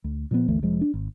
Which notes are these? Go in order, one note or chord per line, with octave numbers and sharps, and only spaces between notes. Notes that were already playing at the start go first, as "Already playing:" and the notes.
D2
A#2 F3 F#3 B3
G1 D2 E3 A3
F1 F3 G#3
D4
G#1